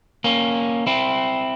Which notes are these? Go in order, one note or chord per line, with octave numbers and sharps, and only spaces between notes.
A#3 C#4
C4 E4